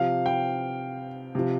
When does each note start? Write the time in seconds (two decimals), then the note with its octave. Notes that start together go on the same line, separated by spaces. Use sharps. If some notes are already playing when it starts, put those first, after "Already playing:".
Already playing: C3 F3 F5
0.26 G5
1.35 C3 F3